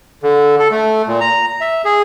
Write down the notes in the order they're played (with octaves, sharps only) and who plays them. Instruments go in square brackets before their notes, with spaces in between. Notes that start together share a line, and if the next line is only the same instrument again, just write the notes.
[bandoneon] D3
A4
A3
A#2
A#5
E5
G#4